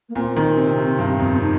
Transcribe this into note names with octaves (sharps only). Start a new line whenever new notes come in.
A#3
A#2 C4
D#3
C3
C3
G2
F2
C4
D#4